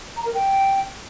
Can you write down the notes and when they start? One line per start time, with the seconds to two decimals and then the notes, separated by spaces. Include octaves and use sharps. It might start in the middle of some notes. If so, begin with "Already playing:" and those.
0.17 A#5
0.25 A#4
0.34 G5